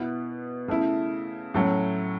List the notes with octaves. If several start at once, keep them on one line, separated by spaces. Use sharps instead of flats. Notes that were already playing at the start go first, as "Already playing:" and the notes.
Already playing: B2 B3 E4
C#3 A3 E4
A2 F#3 A3 C#4